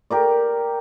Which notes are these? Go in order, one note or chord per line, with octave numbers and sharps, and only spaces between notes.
G4 A#4 D5